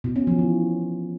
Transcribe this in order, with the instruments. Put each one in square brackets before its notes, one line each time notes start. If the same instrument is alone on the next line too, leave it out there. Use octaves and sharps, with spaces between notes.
[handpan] B2
C#4
F3
E3